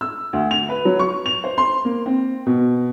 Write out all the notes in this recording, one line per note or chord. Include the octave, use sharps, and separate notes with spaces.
E6
D2
F7
B4
F#3
C#6
F7
C5
C6
A#3
C4
B2